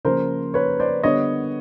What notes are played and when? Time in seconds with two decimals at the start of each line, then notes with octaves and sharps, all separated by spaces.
0.05 C#3 F3 A#3 A#4 C5
0.54 B4 C#5
0.79 C5 D5
1.03 D3 G3 B3 C#5 D#5